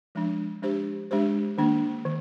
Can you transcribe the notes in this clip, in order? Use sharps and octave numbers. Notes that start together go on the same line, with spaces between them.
F3 G#3 D4
G#3 D4 G4 C5
G#3 D4 G4 C5
D#3 A#3 D4
D#3